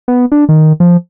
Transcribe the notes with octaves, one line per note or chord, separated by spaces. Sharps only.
B3
D4
D#3
F3